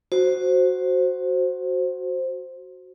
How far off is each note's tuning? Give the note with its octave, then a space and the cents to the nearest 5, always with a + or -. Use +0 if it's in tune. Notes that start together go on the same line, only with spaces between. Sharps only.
F#4 +0 C5 +0